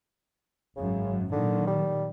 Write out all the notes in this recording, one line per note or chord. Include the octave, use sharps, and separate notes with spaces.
G#1 F#2 C#3
A#2 D3 D#3 F#3
G3